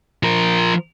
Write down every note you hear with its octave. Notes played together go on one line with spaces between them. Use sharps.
F3 A#4